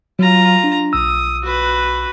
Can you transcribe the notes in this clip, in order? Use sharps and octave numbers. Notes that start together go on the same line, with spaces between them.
F#3 F4 A#5
D4
B1 D#6 E6
F#4 B4